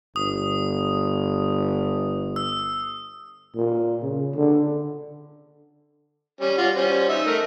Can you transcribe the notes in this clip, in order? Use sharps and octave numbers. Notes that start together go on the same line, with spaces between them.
G1 D#6
E6
A#2
C#3
D3
G3 C#4
G3 F4 F#4
G3 C#4 C5
D#4 E5
A3 A#4